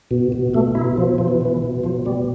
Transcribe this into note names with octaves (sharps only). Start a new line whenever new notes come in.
B2
B2
B2 A3
B2 E4
B2 F3
B2 F3
E3
B2 E3
B2
B2 F3
B2 G3